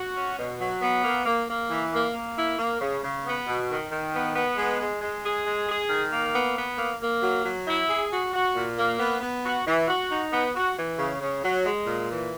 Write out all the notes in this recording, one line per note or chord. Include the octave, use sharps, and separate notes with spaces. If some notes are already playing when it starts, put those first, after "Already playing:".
Already playing: F#4
C#4
B2
F#3
B3
A#3
A#3
A#3
E3
A#3
A#3
E4
A#3
C#3
C#3
B3
B2
D#3
D#3
B3
B3
G#3
G#3
G#3
G#4
G#3
G#4
D#3
A#3
B3
B3
A#3
A#3
F#3
F#3
E4
G#4
F#4
F#4
A#2
A#3
B3
B3
F#4
E3
F#4
D#4
B3
F#4
E3
C#3
C#3
F#3
G#3
A#2
E3